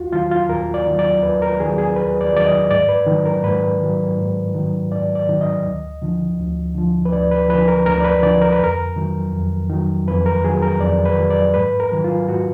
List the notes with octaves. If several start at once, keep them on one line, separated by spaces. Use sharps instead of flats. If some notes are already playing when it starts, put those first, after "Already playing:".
Already playing: D#2 F4 F#4
D#3 F#3 F4
F4
D#2 A#4
D5
D#3 F#3
D5
D#2 B4
A#4
D#3 F#3 G#4
G#4
D#2 B4
D5
D#3 F#3 D5
D#5
G#2 D5
B4
D#3 F#3
A#4
G#2 B4
D#3 F#3
G#2
D#3 F#3
G#2 D5
D5
D#3 F#3
D#5
D2
D3 F3
D2
D3 F3
B4
D2 D5
B4
D3 F3 B4
A#4
D2 A#4
D5
B4
D3 F3 D5
A#4
B4
F2 A#4
D#3 F#3
F2
D#3 F#3
F2 B4
A#4
D#3 F#3 G#4
A#4
F2 D5
B4
D#3 F#3
D5
G#2 B4
A#4
D#3 F#3
F4
G#2 F#4